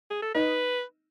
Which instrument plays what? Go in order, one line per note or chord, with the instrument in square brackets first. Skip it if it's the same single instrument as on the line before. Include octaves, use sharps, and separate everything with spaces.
[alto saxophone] G#4
A4
[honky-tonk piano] D#4 [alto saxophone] B4